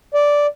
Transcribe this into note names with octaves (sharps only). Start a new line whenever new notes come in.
D5